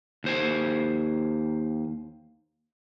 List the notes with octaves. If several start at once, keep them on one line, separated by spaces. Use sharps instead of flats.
D#2 C5 G#5